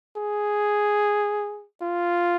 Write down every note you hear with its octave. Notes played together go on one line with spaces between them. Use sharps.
G#4
F4